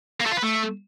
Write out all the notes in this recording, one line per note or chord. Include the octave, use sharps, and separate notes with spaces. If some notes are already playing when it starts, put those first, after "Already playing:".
A#3
A3
F4
B4
A3